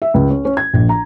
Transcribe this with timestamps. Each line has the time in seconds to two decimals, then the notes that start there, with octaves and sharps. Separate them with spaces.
0.02 E5
0.14 C#2
0.30 C#4
0.45 C#4
0.57 G#6
0.74 A#1
0.89 A#5